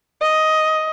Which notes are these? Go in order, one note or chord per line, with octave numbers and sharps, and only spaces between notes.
D#5